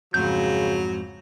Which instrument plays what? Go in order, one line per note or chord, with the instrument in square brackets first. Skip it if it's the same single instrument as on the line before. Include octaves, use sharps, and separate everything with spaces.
[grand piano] F2 G#2 [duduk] C#3 [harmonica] F#3 [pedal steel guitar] G6